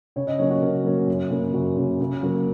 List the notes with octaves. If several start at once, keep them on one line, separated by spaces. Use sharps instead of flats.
C#3 C#5
D#5
F#3 A#3 C#4 C#5
F#4
C#3 A#4
F#3 A#3 C#4
F#2
C#3 A#3
F#2 F#4
C#3 A#3
C#3
F#3 A#3 C#4